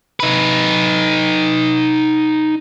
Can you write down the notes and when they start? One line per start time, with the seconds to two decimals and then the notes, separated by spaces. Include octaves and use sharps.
0.20 D#4 B4